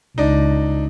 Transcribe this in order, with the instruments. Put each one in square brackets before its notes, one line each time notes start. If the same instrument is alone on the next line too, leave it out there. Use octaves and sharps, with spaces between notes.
[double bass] C#2 [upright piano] D4 D#4